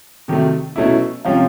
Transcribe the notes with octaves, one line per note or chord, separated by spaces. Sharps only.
C3 D#3 F#3 A3
B2 F#3 A3 C#4 E4
C3 F3 G#3 C#4 F4